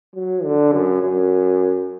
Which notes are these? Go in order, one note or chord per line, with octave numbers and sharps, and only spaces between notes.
F#3
D3
F#2
F#2